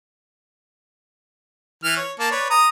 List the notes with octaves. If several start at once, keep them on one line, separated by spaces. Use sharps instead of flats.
E3 F6
C#5
A#3 A5
B4 C#5 D5
A#5 D#6